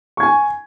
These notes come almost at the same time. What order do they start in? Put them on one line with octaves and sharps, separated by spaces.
C#6 G#6 G#5